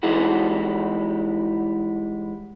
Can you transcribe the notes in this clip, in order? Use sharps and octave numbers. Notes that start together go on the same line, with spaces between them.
E3 G3 G#3 D#4 E4 F#4